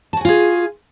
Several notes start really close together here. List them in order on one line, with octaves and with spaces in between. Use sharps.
A5 F#4 G#5 F4 G#4